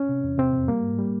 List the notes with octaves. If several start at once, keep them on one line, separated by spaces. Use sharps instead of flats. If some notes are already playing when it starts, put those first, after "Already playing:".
Already playing: C#4
C3
E2
C3 C4
F2
G3 A#3
G#2
G3